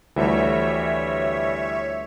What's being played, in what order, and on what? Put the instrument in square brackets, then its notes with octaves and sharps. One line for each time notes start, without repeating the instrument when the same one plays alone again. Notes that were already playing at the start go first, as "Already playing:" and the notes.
[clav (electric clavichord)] D2 [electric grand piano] E3 F3 G3 [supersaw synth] C#5 E5